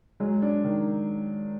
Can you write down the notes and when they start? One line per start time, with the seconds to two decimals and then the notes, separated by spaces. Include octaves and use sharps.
0.20 F#3 G#3
0.42 D4
0.64 D#3